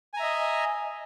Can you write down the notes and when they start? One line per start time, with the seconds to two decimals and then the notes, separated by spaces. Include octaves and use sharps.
0.14 G#5
0.17 A#5
0.20 E5
0.23 D#5